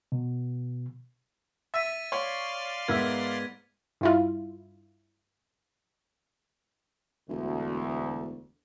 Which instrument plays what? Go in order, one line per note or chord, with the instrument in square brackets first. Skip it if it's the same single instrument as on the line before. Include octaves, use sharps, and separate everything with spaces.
[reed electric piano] B2
[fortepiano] E5 [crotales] A6 B6 D#7
[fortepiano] C#5 [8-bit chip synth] D5 F5 C6
[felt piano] G#2 B3 [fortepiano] A#4 E5 [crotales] G#6 B6
[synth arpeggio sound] G2 E4 F4
[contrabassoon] E1 [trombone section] D2